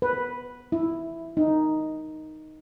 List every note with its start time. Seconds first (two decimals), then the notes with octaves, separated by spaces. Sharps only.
0.02 B4
0.72 E4
1.37 D#4